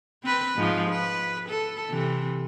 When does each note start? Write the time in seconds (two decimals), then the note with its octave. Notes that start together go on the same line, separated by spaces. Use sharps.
0.24 C4 B4
0.57 G#2 F3 F4
0.90 B4
1.50 A4
1.90 C3 E3